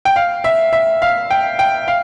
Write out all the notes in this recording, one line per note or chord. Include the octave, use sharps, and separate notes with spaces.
G5
F5
E5
E5
F5
G5
G5
F5